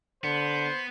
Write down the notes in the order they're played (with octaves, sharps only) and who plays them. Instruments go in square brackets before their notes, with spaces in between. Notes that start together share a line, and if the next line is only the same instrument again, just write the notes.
[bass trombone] D3 [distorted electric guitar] B3 [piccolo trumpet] C5